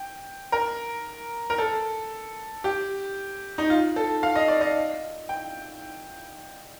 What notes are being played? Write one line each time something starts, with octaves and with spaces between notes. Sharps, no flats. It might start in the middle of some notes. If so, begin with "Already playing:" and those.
Already playing: G5
A#4
A#4
A4
G4
D#4
F4
A4
F5
D#5
D5
D#5
G5